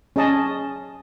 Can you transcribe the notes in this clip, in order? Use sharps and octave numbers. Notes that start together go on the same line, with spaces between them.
C#4 G#4 D#5 A5